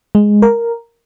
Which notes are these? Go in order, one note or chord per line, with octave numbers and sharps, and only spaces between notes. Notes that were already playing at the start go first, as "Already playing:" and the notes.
G#3
A#4